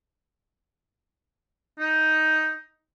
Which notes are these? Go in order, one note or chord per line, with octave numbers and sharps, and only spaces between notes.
D#4